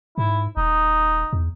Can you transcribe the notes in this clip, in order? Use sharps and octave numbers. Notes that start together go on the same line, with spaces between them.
G#2 E4
D#1 D#4
E2